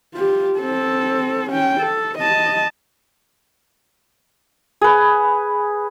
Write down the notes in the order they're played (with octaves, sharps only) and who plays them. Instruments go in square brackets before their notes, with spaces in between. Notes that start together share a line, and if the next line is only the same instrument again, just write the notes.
[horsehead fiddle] F4 G4
C4 A4
C#4 G5
A4
D#5 A5
[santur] G#4 B4